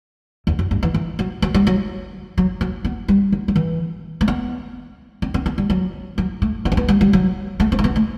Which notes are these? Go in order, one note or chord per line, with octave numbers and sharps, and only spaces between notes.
E2
F#2
G2
E3
E3
F#3
F#3
G3
F#3
F#3
F#3
B3
G3
F#3
F#3
E3
A3
B3
C4
C4
B3
G3
F#3
F#3
A3
B3
C4
B3
G3
G3
F#3
A3
C4
A3
B3
A3